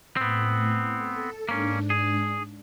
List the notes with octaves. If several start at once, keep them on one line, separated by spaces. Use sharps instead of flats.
A2 B3 C4
A4
G#2 A#3 C#4 D4
G#4